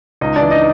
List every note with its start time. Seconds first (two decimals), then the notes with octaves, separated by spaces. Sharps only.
0.21 C#2 D#4 D#5
0.36 D4 D5
0.41 E3
0.51 D#4 D#5